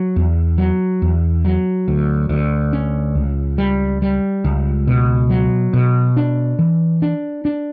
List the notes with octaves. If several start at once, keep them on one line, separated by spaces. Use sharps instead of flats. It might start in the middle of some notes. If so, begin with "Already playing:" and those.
Already playing: F#3
E2
F#3
E2
F#3
D2
D2
C#4
C#2
G3
G3
C#2
B2
F#3
B2
D4
E3
D4
D4